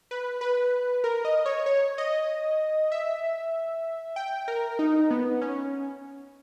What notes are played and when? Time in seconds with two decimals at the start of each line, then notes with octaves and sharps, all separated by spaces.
0.11 B4
0.41 B4
1.04 A#4
1.25 D#5
1.46 C#5
1.66 C#5
1.98 D#5
2.92 E5
4.16 G5
4.48 A#4
4.79 D#4
5.11 B3
5.42 C#4